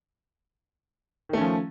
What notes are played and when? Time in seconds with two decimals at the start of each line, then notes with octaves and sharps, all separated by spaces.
1.29 D#3
1.33 A3
1.37 C#4
1.41 F3